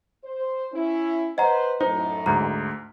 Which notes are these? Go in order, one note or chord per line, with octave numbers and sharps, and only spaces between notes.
C5
C#4 E4
B4 C5 D#5 F#5 A#5
F#2 A2 D#4 C5
D2 G#2 A#5